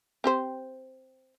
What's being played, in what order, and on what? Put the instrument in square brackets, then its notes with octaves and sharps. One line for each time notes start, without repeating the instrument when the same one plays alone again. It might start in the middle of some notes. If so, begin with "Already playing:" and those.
[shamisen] C4 G4 C5